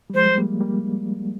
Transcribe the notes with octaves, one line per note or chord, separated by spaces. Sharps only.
G3
F3 G#3 C5
G3
G#3
G3 A#3
G3 A#3